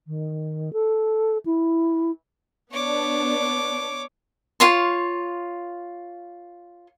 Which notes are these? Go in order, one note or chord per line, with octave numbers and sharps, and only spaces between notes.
D#3
A4
E4
B3 D4 C#5 D6
F4 C#5 C6